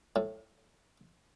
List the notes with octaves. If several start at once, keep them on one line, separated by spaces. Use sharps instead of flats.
A2